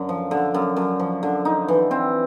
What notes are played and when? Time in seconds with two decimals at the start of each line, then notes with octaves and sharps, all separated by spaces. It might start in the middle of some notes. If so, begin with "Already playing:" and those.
Already playing: F#2 D3
0.09 F3
0.31 D3
0.54 F#2
0.76 F#2
1.00 F3
1.23 D3
1.45 D#4
1.68 E3
1.91 C4